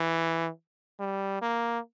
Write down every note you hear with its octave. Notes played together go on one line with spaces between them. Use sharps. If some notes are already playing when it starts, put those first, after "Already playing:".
Already playing: E3
G3
A#3